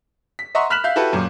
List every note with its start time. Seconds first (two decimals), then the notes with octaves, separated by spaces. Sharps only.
0.39 B6
0.55 D#5 E5 F#5 A#5 C6 C#6
0.70 B5 F6 F#6 B6 E7 F#7
0.84 E5 F5 G6
0.96 E4 F#4 G4 A4 B4
1.13 F#2 A#2